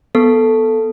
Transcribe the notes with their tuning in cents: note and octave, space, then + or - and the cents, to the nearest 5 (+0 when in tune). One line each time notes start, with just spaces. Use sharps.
B3 -5 A4 +0